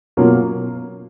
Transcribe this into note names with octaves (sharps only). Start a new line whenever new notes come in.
B2 F#3 A#3 C#4 F4